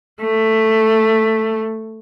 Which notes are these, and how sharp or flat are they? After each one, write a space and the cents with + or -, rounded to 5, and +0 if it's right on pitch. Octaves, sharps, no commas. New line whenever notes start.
A3 +5